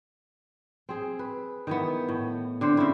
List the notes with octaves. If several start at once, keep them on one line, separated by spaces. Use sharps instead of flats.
C4 G#4
B4
D#3 E3 B3
A2
D3 C4 C5
C#3 E4